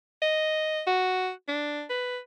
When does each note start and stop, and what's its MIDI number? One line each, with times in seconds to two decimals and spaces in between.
0.22 0.81 75
0.87 1.31 66
1.48 1.84 62
1.90 2.19 71